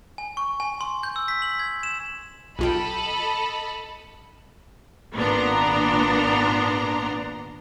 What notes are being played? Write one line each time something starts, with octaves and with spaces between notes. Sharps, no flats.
G#5
C#6
G#5
C6
G6
E6
B6
F#7
G#6
E7
B1 F4 A4 D#5 G5 B5
G#1 A#2 B3 D4 A#5 C6